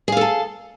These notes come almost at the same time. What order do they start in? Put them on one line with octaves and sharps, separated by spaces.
G#4 F5 A4 A5